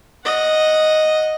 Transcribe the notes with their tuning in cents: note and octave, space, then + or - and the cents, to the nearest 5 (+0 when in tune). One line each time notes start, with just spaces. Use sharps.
D#5 +0 F#5 -10